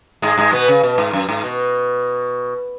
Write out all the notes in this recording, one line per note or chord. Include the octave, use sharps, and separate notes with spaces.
G#2 G#3
G#2 G#3
B2 B3
C#3
B2
G#2
F#2
G#2
B2